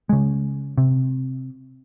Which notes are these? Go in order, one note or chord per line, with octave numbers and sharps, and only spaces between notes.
C#3 G#3
C3